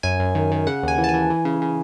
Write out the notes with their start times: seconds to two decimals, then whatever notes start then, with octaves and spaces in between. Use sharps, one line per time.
0.03 F#2 G#5
0.20 F#2
0.35 D#3
0.52 D#3
0.67 C#3 F#5
0.83 D#2 G#5
0.98 E3
1.04 A5
1.09 G#5
1.14 E3
1.30 E3
1.45 C#3
1.62 C#3